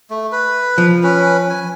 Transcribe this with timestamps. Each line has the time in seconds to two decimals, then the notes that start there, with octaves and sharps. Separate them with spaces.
0.10 A3
0.32 B4
0.78 F3
1.03 C#4 B4
1.50 G#5